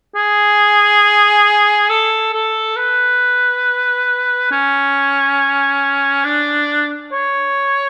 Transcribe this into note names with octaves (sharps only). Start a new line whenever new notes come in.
G#4
A4
A4
B4
C#4
D4
C#5